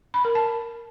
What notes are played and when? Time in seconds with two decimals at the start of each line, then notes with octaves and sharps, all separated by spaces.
0.14 B5
0.25 A#4
0.35 A5